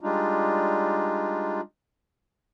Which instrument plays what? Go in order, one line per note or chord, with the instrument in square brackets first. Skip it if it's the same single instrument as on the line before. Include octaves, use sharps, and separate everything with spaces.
[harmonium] G3 G#3 D4 D#4 F4